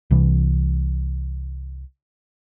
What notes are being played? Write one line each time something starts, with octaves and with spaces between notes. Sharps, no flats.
C2 C3 E3